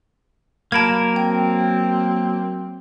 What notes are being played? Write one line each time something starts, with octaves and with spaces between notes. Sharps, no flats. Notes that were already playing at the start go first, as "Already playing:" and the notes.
F#3 A#3 A#4 A5 B5 G#6
C4 G5